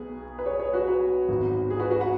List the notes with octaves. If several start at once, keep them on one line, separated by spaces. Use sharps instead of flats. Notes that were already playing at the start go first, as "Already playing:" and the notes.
Already playing: B1 B2 B3 G#4
B4
G#4 C#5
G#4 C#5
F#4 B4
F#4 B4
G#1 G#2 F#3 B3
G#4
F#4 B4
F#4 B4
F#5 B5